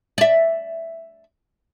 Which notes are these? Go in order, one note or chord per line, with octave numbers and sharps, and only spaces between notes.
D5 E5